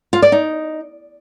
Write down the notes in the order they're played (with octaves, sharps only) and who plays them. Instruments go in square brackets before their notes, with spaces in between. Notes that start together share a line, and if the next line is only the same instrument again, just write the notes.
[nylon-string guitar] F4
D5
D#4